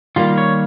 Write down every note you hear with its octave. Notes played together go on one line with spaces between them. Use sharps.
D#3 G3 A#3 F4
C#5